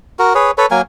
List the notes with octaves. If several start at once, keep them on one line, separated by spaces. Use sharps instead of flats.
F#4 A#4
G#4 B4 C#5
A4 B4 C#5
F#3 A#3 A#4 G#5